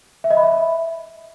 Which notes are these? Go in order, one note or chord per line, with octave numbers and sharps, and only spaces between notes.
E5
D#5
B5
E5